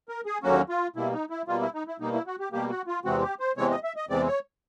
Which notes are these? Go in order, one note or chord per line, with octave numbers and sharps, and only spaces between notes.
A#4
G#4
D#2 D3 F#3 A#3 C#4 F#4
F4
B2 G3 A#3 E4
D#4
E4
B2 G3 A#3 F4
E4
D#4
E4
B2 G3 A#3 D#4
E4
F#4
G4
B2 G3 A#3 G4
F#4
F4
E2 C3 E3 G#3 C4 F#4
G4
C5
E2 C3 E3 G#3 C4 C#5
D#5
E5
D#5
E2 C3 E3 G#3 C4 D5
C#5